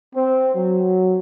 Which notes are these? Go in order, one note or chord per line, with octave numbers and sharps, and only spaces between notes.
C4
F#3